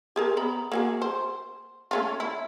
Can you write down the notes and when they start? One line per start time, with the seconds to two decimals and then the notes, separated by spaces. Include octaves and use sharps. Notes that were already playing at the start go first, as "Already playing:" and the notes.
0.16 G4 G#4 A#4
0.37 B3 A#5 B5
0.72 A#3 F#4 G#4
1.02 C5
1.91 A3 C#4 F4
2.20 E4